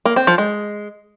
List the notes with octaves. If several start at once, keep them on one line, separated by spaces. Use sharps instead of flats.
A#3
C4
F3
G#3